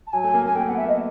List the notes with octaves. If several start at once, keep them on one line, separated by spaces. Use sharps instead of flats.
A5
F#3 G#5
A3
A#3
A#3 G#5
A3 G5
F#5
B3
E5
A#3 D#5